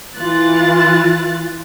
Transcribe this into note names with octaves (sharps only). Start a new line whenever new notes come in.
E3 F4 F#6 A6